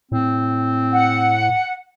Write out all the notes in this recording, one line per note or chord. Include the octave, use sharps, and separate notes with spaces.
A2 C4
F#5